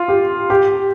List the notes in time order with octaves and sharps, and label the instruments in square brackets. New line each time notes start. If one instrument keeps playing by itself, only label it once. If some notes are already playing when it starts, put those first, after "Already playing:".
Already playing: [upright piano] F4
G4
G4